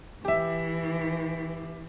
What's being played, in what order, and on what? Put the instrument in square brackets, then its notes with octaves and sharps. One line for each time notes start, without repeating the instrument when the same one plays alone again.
[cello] E3 [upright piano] G4 E5